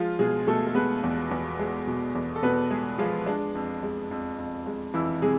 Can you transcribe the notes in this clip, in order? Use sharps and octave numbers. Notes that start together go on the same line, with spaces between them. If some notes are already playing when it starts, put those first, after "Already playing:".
Already playing: F3 G#3 F4
B2 G#3 G#4
B2 A3 A4
A4
G#3 B3 B4
E2
E2
G#3
B2
E2
A4
B2 B3 B4
G#3 G#4
F3 G#3 F4
G#3 D4
F2
G#3
F2
F2
G#3
F2 E3 E4
C3 G#3 G#4